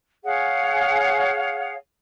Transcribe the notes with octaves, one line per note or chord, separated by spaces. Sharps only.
G#4 C#5 F5 F#5